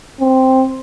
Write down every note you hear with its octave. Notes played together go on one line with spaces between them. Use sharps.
C4